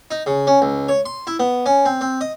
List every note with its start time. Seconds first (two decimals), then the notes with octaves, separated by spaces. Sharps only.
0.11 D#4
0.26 C#3
0.47 C#4
0.62 C#2
0.88 C#5
1.06 C6
1.27 E4
1.39 B3
1.66 C#4
1.85 C4
2.01 C4
2.21 D#5